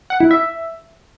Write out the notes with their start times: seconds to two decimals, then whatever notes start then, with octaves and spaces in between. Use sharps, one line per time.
0.10 F#5
0.20 E4
0.31 E5